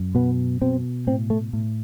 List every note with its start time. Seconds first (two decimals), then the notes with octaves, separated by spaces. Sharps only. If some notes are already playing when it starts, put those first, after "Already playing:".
Already playing: F#2
0.15 B2 B3
0.62 B2 C4
1.07 A2 C4
1.30 A3
1.53 A2